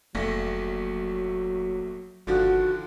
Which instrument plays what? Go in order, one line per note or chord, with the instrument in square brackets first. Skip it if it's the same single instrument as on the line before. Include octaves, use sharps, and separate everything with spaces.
[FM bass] F1 [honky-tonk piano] A#1 A3 A#6 [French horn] F#3
[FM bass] G1 [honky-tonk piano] D3 D#3 F3 [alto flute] F#4